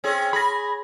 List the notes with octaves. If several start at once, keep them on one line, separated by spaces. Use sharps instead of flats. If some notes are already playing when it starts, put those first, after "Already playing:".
C4 C#4 G#4
G#4 B5 A#6